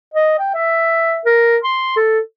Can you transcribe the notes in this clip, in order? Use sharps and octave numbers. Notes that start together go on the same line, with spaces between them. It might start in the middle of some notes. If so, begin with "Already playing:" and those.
D#5
G5
E5
A#4
C6
A4